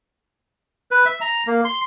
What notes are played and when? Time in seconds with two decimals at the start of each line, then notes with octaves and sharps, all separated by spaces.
0.91 B4
1.06 E5
1.21 A#5
1.47 A#3
1.65 C6